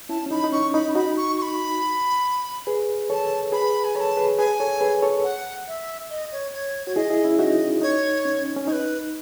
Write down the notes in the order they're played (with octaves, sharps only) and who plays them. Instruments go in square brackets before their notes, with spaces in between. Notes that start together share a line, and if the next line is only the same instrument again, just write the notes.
[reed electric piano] C#4 E4 [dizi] A5
[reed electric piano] C#4
[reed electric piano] D#4 [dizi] B5
[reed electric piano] D#4
[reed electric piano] C#4 [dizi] C#6
[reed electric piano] D#4 [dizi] B5
[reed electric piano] D#4 F#4 [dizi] B5
[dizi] C#6
C#6
B5
[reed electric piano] G#4 B4
[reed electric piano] A4 C#5 [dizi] A5
[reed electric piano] G#4 B4 [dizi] B5
[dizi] G#5
[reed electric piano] A4 C#5 [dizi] B5
[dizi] A5
[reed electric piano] G#4 B4
[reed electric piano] G#4 B4 [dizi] G#5
[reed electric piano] A4 C#5
G#4 B4
A4 C#5
[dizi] F#5
E5
D#5
C#5
C#5
[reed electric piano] F#4 [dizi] C#5
[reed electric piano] E4 G#4 [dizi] D#5
[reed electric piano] E4 G#4
C#4 E4
[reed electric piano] D#4 F#4 [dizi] E5
[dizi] D#5
[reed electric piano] D#4 [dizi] C#5
[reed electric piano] C#4
C#4
[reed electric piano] D#4 [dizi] C#5
[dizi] B4